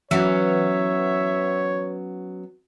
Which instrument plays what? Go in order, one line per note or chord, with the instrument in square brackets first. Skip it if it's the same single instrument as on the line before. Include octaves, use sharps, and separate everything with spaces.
[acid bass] E3 [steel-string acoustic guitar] F#3 B3 C#4 [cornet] C#5 [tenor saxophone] E5